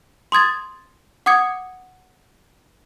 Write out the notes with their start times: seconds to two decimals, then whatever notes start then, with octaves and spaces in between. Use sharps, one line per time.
0.32 C6 D#6 G#6 A6
1.26 F#5 D6 D#6 G#6 C#7